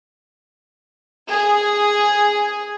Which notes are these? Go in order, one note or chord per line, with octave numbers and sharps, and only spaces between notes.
G#4